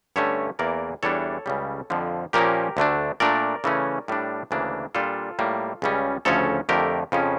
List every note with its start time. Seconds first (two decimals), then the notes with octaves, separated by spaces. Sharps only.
0.16 G2 D3 A3 C#4 C#5 E5
0.59 E2 E3 A#3 A#4 D5
1.03 E2 E3 G3 D4 A4 C#5
1.46 C#2 C#3 G3
1.90 F2 D3 F3
2.33 A#2 F3 A#3 C#4 G4 A#4
2.77 D2 D3 A3 D4
3.20 A#2 A3 D4 A#4 D5
3.64 C#3 E3 A3 C#4
4.08 A2 G3 D4
4.51 D2 C#3 E3 A#3 D4
4.95 A#2 G3 D4 F4 A4
5.39 A2 G3 A#3
5.82 C#2 C#3 G3 C#4
6.25 D2 C#3 F3 C#4 A4 C#5
6.69 F2 D3 A3 G4 A#4
7.12 F2 C#3 F3 C#4